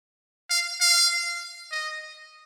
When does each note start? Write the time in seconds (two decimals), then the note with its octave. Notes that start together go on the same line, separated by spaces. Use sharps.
0.50 F5
0.81 F5
1.72 D#5